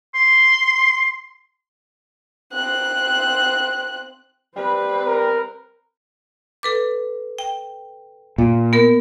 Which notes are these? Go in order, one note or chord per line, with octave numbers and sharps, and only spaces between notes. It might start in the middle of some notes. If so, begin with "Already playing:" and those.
C6
C4 F#6
G3 C4 B4
A#4
A4 B4 D6
G5
A#2
B3 A#4